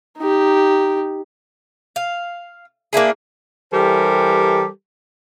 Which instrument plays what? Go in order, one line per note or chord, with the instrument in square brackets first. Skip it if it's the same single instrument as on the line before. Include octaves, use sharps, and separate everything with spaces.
[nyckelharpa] D#4 G4
[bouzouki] F5
A#3 D4 E4 G#4
[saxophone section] E3 G3 G4 A4 A#4 C5